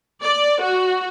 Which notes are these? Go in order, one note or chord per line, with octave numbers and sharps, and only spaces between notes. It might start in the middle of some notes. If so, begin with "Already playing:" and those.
D5
F#4